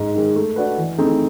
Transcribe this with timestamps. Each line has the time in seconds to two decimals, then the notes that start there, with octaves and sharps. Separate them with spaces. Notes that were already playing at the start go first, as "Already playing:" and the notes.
Already playing: G#2
0.15 D#3 G#3
0.36 A3
0.56 D4 F#4 B4
0.78 E3
0.98 A3 C4 D#4 G#4